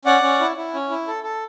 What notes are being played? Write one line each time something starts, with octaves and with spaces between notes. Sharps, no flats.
C#4 D5 F#5
C#4
E4
E4
C#4
E4
A4
A4